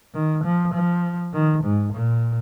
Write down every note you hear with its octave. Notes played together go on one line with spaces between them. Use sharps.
D#3
F3
F3
D#3
G#2
A#2